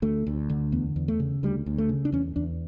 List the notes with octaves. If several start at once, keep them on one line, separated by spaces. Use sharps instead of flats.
D2 A3
D2
D3
E2 B3
E2
A3
C#3
D2 G3
D2
A3
C#3
D4
E2 C#4
E2 D4